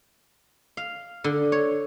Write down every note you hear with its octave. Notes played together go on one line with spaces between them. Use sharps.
F5
D3
C#5